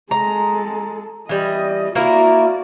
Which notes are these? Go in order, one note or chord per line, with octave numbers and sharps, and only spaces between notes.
G#3 A4 A#5
E3 G3 D#5
A#3 E4 F#4 A#4 D5